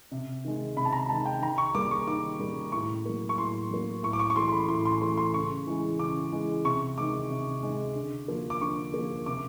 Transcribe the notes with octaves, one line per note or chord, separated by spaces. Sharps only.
C3
D#3 G#3
C3 B5
A5
A#5
D#3 G#3 A5
G5
D#3 A#5
C#6
G3 A#3 D6
C#6
D#3 D6
G3 A#3
A2 C#6
F#3 A#3
C#6
A2 C6
F#3 A#3
A2 C#6
D6
C#6
C#6
E3 A3 C6
C6
B5
A2 C6
C6
E3 A3 C6
C6
C#3 C#6
E3 G#3
C#3 D6
E3 G#3
C3 C#6
D#3 G#3 D6
C3
D#3 G#3
D3
F3 A#3
D6
D3 C#6
F3 A#3
C3 D6